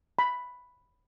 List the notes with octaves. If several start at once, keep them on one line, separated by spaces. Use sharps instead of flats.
B5